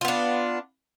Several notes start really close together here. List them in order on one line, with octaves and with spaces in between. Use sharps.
F4 B3 D4